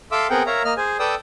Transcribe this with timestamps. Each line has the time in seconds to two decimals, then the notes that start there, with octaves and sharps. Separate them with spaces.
0.12 A4 E5 F5 C6 D6 E6
0.30 B3 C4 G#4 A#4 F#5 G5
0.46 A#4 C#5 E5 F5 A#5
0.65 A#3 D#5 F6
0.77 G#4 C5 G#5
0.99 A4 B4 D5 G5 D#6 E6